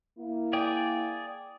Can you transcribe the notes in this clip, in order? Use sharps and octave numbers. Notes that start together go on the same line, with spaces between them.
A#3 E4
G#4 D5 G5